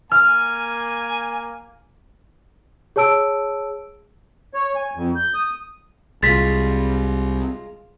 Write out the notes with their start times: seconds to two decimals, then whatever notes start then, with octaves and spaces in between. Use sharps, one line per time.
0.11 A#3 G#5 F6
2.96 G#4 C#5 A5 E6 D7
4.54 C#5
4.76 G#5
4.96 F2
5.15 G6
5.34 D#6
6.23 C2 G#3 F4 A6 B6